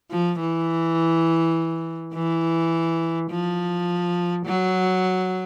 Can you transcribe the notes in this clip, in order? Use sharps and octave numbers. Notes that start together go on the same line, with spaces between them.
F3
E3
E3
F3
F#3